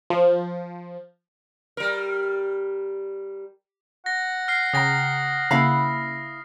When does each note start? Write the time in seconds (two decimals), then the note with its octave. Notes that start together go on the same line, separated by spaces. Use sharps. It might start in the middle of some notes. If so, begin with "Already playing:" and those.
0.10 F3
1.77 G3 A#4
4.06 F#5 A#6
4.48 F6 C7
4.73 C#3 G5 A#5 D#6 A#6
5.51 C#3 A#3 E4 F5 B5